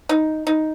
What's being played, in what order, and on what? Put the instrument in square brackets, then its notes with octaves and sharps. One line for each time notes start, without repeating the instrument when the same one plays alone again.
[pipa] D#4
D#4